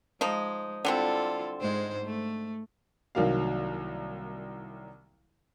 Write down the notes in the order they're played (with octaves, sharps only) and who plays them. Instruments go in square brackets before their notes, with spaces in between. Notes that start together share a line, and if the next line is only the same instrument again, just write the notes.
[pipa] F3 D#4 [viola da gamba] G#3
[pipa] D3 G3 C4 [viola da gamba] E4 F4 A4
[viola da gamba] G#2 G#3 C5
A3
[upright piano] C2 D#3 F#3 A#3 F5